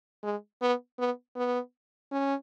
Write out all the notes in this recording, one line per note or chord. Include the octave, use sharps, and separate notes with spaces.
G#3
B3
B3
B3
C#4